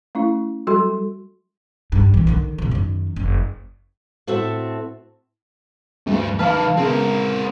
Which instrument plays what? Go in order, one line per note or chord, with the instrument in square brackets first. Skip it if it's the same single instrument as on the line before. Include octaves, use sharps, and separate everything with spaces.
[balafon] A3 C#4 E4
F#3 G3 F#4 A4 C6
[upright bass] G2
A2 E3
D3 D#3
A#2 C#3
F#2 D#3
F#1
[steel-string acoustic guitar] A2 C4 F#4 A4 E5
[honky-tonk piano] D2 [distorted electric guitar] G2
[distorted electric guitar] D#3 B4 [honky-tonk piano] F5 A5 F6
[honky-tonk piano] C#3 B3 [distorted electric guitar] C4 A#4